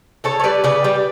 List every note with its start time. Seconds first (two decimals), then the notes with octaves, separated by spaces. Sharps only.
0.24 C#3 A4 C#5
0.40 C#5
0.44 G3 B4 D5
0.64 C#3 B4 D5
0.84 G3